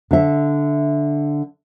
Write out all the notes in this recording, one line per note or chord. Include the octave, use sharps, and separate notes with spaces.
D3 E5